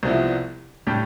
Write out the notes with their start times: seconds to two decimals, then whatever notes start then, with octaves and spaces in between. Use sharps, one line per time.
0.03 C2 C3 F3 B3 E4
0.87 A2 G3 D4 G4